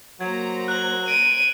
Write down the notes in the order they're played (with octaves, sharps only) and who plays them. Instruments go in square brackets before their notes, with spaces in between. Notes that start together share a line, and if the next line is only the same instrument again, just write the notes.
[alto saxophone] F#3 [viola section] A#3 C5 A#5 [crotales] G#6
[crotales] F#6 F#7
[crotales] D7 [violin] D#7